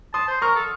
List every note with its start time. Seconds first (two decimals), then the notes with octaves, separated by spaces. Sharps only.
0.14 A5 C6 D#6
0.28 C5
0.41 A#4 C#6 F6
0.55 A4